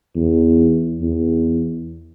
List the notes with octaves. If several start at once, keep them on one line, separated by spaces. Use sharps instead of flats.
E2
E2